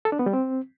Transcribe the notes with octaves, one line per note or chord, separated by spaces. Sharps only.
A4
D4
B3
G3
C4